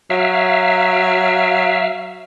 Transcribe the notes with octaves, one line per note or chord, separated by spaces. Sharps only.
F#3 E5 F5